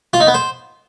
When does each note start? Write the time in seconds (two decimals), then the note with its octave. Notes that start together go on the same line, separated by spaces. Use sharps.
0.13 F4
0.20 D#4
0.27 B3
0.34 C5